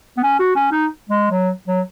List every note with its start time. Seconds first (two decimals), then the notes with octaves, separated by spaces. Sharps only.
0.17 B3
0.23 C#4
0.39 F#4
0.56 C#4
0.71 D#4
1.09 G#3
1.30 F#3
1.68 F#3